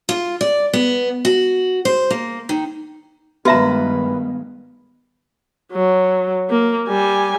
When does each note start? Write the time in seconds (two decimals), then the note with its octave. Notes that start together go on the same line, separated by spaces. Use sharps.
0.09 F4
0.41 D5
0.73 B3
1.25 F#4
1.85 C5
2.10 A#3
2.49 D#3
3.45 G2 D#3 G#3 B3 F#4 B4 E5 A#5
5.72 F#3
6.50 A#3
6.88 G3 G#5